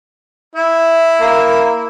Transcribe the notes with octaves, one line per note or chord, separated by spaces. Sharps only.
E4 E5
A#3